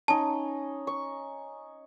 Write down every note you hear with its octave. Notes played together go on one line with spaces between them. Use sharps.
C#4 D#4 A5
C#6